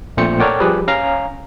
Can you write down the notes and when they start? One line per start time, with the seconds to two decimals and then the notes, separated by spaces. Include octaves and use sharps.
0.17 A#1 A#2 A3 C4 C5 C#7
0.40 A4 A#4 C#5 D5 F#5 G5
0.60 F3 G3 G4 G#4 B4
0.88 C#4 F5 A#5